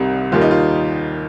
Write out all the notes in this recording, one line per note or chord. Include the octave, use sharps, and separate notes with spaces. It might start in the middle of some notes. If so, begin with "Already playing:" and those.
Already playing: C2 C3 D#3 G3
D#2 D#3 G3 F4
D#4
F4